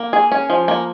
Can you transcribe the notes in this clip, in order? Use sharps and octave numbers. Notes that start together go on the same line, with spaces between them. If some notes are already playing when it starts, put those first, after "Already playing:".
Already playing: A#3
G#4
C#4
F3
A#3